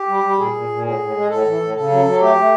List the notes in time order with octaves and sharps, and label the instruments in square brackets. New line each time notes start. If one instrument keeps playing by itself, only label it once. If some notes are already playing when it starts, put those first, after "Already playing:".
Already playing: [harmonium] G4
G3
G3
A#2 G#4
A#2
A#2
A2 G#4
A2
G#3
A2 A4
E3
A2
C#3 A4
F#3
F#3
A3 G4
A3